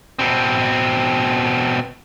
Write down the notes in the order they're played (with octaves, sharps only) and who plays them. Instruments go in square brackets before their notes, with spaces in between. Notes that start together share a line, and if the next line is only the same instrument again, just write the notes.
[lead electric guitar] B2 C4